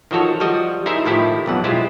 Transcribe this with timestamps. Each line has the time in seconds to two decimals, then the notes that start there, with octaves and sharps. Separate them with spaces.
0.11 D#3 F3 F#4 A4 C#5
0.40 F3 G3 F#4 D#5
0.86 D#4 E4 G#4 A#4 C5 E5
1.06 A2 D#3 F3 E4 G4
1.46 B1 F2 F#5
1.64 G#3 E4 F4 G4 C5